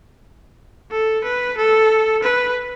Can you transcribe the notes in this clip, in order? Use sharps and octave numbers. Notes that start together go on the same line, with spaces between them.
A4
B4
A4
B4